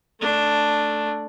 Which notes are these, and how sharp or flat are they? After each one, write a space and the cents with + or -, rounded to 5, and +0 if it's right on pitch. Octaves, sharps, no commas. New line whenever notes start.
A3 +0 D4 +0